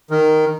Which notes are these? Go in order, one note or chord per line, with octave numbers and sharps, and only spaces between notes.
D#3